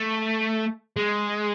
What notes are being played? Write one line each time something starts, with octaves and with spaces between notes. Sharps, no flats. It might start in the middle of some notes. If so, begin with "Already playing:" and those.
Already playing: A3
G#3